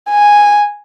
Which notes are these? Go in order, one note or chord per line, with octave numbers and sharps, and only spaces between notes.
G#5